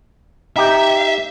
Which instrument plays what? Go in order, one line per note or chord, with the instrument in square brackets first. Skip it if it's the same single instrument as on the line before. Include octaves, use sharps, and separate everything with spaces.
[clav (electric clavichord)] D#4 G4 G5 [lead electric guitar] E5